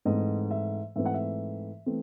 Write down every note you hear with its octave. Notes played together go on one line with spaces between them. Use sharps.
G#2 E3 A3 C4 D#5
E5
G#2 E3 A3 C4 E5
F#5
E5
E3 A3 C4